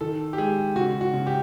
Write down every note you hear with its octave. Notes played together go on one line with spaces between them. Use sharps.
D#3 A4
G4
G#3 G#4
C#3 F#4
F#4
C#3
G4